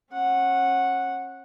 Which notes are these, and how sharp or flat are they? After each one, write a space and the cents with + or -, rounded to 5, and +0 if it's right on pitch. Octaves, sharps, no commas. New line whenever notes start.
C#4 -35 F#5 -5